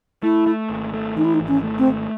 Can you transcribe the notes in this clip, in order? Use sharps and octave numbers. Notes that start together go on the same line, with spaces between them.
A3 E4
A3
G#1
A3
E3 D#4
E4
D#4
G#1
C#4
A3
C4
G#1